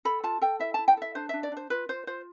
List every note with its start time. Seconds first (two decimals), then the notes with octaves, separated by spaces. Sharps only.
0.05 A4 B5
0.24 F4 A5
0.42 A4 G5
0.60 E4 E5
0.74 E4 A5
0.88 G5
0.97 A4 E5
1.15 D4 C5
1.29 D4 E5
1.43 D5
1.52 D4 C5
1.70 F4 B4
1.89 F4 C5
2.07 F4 C5